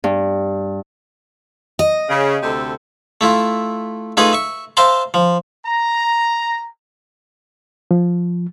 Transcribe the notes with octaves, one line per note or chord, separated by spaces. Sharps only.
G2
D#5
C#3
D2 C3 A4
A3 E4 F4
A3 D#4 F4 G#4 B4 G#5
E5 C#6
C5 E5 F5 A5 A#5 C6
F3
A#5
F3